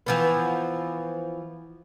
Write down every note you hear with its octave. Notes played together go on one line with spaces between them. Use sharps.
E3 F3 B3